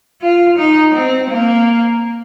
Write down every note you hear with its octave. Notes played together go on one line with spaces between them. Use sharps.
F4
D#4
C4
A#3